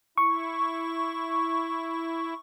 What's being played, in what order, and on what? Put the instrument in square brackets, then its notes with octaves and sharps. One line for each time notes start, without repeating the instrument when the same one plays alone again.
[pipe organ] E4 [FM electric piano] C#6